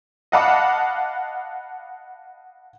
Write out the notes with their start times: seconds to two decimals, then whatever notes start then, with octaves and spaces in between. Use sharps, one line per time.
0.32 D#5 F5 F#5 A5 B5 D6